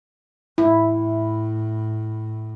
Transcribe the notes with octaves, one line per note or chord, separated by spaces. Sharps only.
A2 E4